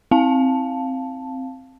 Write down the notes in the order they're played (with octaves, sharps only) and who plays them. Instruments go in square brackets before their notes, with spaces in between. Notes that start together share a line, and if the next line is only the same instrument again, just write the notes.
[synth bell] C4 F5 A5